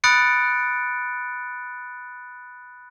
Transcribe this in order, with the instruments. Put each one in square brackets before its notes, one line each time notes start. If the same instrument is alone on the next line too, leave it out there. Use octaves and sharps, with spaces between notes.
[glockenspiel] B5 D#6 F#6 A6 C#7 D7